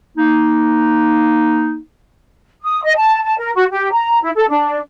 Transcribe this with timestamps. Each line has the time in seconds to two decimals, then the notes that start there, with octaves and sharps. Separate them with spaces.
0.16 A#3 D#4
2.61 D#6
2.83 D#5
2.96 A5
3.23 A5
3.38 A#4
3.55 F#4
3.71 G4
3.91 A#5
4.22 E4
4.36 A4
4.49 D4